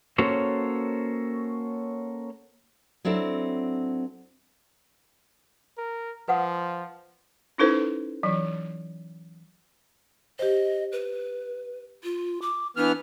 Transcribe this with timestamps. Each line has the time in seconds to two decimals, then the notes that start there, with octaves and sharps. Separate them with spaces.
0.18 A#3 C#4 F#4 A4 C5 C#5
3.05 F#3 C4 D4 E4 A4
5.78 A#4
6.28 F3 B4 F#5 D#6
7.58 C#4 D#4 E4 A4 B4 C5
8.23 E3 F#3
10.39 G4 C5 D#5
10.92 B4
12.04 F4
12.42 D6
12.77 E3 B3 D4 F6